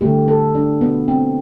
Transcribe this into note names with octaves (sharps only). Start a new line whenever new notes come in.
D3 A3 G4
A4
D4
B3
C4